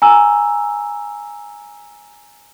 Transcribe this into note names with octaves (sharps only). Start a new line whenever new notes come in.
G#5 A#5 E6